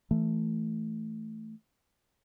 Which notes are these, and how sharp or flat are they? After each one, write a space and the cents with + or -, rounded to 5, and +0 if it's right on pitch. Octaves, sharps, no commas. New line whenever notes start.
E3 +0 A3 +0